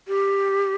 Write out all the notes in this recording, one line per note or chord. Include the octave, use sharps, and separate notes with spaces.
G4